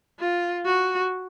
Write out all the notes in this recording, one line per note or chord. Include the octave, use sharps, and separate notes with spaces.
F4
F#4